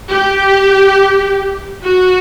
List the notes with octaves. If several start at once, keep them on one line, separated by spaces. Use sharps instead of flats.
G4
F#4